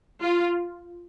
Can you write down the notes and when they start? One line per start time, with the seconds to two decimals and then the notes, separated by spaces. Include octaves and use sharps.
0.22 F4